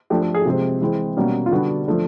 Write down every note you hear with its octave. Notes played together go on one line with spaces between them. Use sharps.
F3 A3 D4 G4
A4
G#4
C3 F3 G#3 C4 G4
E3 G#3 C4
B2 G3 A#3 C#4
F4
D3 G3 B3 D4 F#4
F3 A3 D4